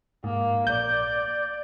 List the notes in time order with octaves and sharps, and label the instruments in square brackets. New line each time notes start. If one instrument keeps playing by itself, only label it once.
[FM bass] G#2 [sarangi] A#3
[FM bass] A#1 [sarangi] D5 [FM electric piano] G6